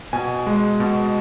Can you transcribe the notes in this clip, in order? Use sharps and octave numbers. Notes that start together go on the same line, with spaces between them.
B2 G#5
G#3
B2